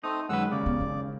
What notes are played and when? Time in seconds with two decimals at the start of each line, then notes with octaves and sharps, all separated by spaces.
0.04 A3 C4 D#4 D#6
0.29 F#2 D#3 G#3 B4 F#5 E6
0.51 D#2 C#3 D5
0.66 B3
0.80 C#4 E4